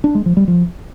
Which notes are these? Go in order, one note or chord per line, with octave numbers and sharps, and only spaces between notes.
D4
G#3
F3
G3
F3